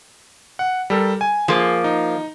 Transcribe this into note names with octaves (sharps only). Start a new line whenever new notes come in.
F#5
G3 A4 A#4
G#5
F3 A#3 G#4
D#4